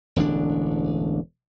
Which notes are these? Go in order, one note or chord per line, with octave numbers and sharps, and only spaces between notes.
E1 A1 D3 D4